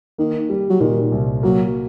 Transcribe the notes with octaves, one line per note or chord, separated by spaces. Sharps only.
D#3 A#3
G3
F#3
A#2 D#3
C2
F#3 A#3